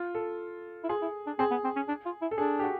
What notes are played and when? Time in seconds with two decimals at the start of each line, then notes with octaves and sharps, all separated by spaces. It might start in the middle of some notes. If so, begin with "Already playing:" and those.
Already playing: F4
0.15 A4
0.84 E4
0.89 F4 G#4
1.02 E4
1.26 D4
1.39 C4 G#4
1.51 B3
1.64 C4
1.76 C#4
1.88 D4
2.05 F4
2.22 E4
2.31 A4
2.38 D4 G#4
2.59 G4
2.64 F#4